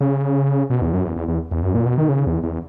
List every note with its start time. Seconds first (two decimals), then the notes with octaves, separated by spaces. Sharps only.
0.01 C#3
0.70 B2
0.82 E2
0.93 F#2
1.05 E2
1.16 E2
1.28 E2
1.51 E2
1.63 F#2
1.75 A#2
1.86 B2
1.98 D#3
2.09 C#3
2.27 E2
2.43 E2